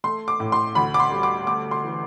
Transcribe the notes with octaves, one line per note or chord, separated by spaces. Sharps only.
A3 C6
D6
A2
C6
D2 B5
D6
C6
G3
D6
A3 D6
C6
E3